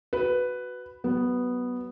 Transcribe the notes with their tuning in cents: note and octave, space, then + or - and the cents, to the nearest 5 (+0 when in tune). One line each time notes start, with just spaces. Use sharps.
F#4 +0 B4 +5
F#3 +35 B3 +0